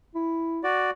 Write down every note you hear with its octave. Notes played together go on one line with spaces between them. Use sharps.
E4
F#4 D5